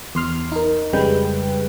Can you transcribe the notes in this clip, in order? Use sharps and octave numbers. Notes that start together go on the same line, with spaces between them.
E2 C6 F6
D#4 A#4
F2 C#3 G3 G#3 B4 G5